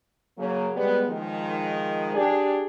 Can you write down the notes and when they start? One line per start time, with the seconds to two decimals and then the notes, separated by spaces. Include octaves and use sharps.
0.38 C#3 F#3 A#3
0.75 G3 G#3 B3
1.08 D#3 F3 G#3
2.14 D4 G4 G#4